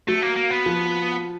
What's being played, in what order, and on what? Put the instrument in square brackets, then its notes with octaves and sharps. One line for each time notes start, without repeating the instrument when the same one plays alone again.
[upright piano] F#3 [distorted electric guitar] A3
[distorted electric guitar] A#3
A#3
B3
[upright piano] F3